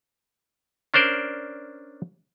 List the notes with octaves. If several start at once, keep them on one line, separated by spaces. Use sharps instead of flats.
C#4 D4 A#4 C5 D5